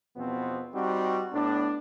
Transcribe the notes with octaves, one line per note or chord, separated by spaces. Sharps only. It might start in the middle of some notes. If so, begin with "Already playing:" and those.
E2 B2 F3 B3 C4
G3 C4 D#4 F#4
A2 B3 D4